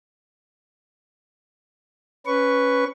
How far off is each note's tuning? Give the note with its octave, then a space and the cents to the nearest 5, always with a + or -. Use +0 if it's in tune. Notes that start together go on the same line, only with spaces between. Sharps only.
C#4 +0 B4 +0 C#6 +5